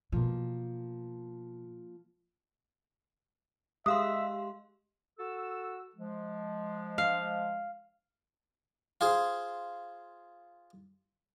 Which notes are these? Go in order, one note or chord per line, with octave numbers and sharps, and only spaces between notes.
B2 F3 A#3
G#3 G4 E5 F5 C6 D#6
F#4 A4 E6
F3 G#3
F5
F4 G#4 C5